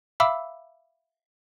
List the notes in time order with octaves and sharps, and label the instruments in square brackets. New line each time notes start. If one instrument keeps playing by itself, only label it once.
[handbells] E5 F5 B5 D6 E6